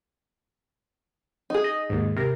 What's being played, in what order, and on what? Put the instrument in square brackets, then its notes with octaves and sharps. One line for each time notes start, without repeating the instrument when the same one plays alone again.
[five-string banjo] D#4 G#4
[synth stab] D#5
D#2 G#2
C3 A#4